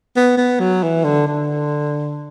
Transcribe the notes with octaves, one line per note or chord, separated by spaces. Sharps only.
B3
B3
F#3
E3
D3
D3